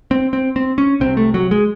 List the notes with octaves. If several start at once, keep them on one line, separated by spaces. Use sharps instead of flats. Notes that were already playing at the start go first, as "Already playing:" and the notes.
C4
C4
C4
C#4
C2 C3 C4
A3
F#3
G#3